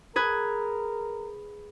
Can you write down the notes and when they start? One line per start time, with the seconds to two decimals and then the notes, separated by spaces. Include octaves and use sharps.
0.16 G#4 A#4 B4 G#6